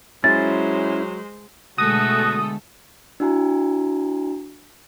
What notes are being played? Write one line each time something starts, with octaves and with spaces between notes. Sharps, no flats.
F#3 G#3 C#4 E4 C5 A6
B2 D3 G#3 A3 F#4 A4 D#6
D4 E4 F#4 G#5 A#5